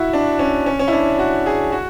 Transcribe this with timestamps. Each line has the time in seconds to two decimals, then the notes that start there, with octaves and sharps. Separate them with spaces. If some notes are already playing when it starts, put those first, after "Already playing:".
Already playing: E4 F#4
0.13 D4
0.39 C#4
0.66 C#4
0.79 C#4
0.88 E4
0.93 D4
1.19 F#4
1.46 G#4
1.72 F#4